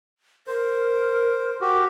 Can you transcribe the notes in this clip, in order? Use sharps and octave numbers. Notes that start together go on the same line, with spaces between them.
A#4 C5
F#4 G4